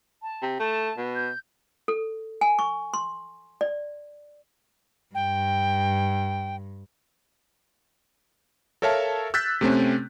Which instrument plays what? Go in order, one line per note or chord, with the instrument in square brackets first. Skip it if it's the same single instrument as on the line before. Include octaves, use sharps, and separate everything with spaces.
[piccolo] A5
[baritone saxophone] C3
[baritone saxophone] A3 [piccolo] A5
[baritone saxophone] B2
[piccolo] G6
[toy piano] A4
G#5
C#6
C6
D5
[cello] G2 [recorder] G5
[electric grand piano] A4 A#4 C#5 E5 F5 A5
E6 F#6 G6 A6 B6
C3 A3 C4 C#4